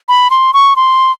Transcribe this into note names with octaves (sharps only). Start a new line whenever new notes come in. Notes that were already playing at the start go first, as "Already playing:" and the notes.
B5
C6
C#6
C6